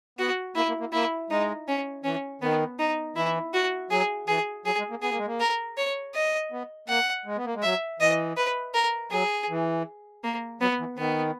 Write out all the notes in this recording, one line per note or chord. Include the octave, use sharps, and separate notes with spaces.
B3 F#4
A#3 E4
A#3
A#3
A#3 E4
G#3 D#4
C#4
E3 C#4
D#3 B3
D#4
E3 E4
F#4
F#3 G#4
E3 G#4
F#3 G#4
G#3
A#3
B3 G#4
A#3
G#3
A#3
A#4
C#5
D#5
B3
A#3 F#5
G#3
B3
A#3
G#3
F#3 E5
E3 D#5
B4
A#4
F#3 G#4
E3
A#3
F#3 B3
E3
D#3 B3